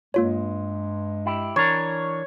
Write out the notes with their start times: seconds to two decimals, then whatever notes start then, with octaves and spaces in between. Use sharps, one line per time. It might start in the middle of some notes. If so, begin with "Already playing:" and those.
0.14 G2 G#3 A#3 F4 C#5
1.26 E4 G4
1.56 E3 D4 A#4 C#5